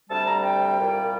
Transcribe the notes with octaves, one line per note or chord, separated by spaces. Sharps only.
D2 C3 G3 A5
A#5
G5
C2 A#2 G3